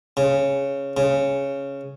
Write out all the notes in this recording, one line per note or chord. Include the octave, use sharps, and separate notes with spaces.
C#3
C#3